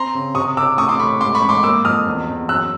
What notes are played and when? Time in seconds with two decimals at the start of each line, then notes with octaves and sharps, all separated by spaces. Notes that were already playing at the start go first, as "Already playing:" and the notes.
Already playing: C4 A#5 C6
0.15 C#3
0.35 C3 C#6 D#6
0.57 C3 D6 E6
0.78 A2 C#6 D#6
0.88 C6 D6
1.00 A2 B5 C#6
1.21 G#2 C6 D6
1.35 B5 C#6
1.42 G#2
1.49 C6 D6
1.63 A#3 D6 E6
1.85 F2 D#6 F6
2.06 E2
2.28 E2
2.49 F#2 E6 F#6